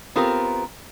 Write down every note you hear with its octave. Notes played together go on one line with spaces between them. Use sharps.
B3 C4 F4 G4 A#4